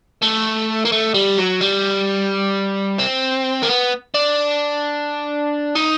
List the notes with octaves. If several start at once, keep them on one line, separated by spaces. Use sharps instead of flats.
A3
A#3
A3
G3
F#3
G3
C4
A#3
B3
D4
D#4